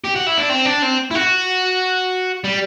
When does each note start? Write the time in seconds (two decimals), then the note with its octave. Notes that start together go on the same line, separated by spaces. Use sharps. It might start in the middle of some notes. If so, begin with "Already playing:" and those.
0.04 G4
0.16 F#4
0.27 E4
0.38 D4
0.50 C4
0.66 D4
0.83 C4
1.11 E4
1.15 F#4
2.44 G3